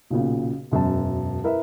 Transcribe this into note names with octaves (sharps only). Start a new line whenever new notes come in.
B1 A#2 C#3
E1 F#2 F#3 A5
E4 A#4 B4 E5